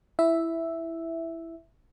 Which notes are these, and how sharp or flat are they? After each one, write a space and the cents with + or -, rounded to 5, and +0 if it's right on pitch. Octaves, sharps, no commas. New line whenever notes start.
E4 +5 E5 +0